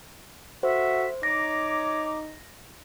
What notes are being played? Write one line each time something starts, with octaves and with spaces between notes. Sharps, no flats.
F#4 A4 C5 E5
D#4 C#5 A#5 D6 A#6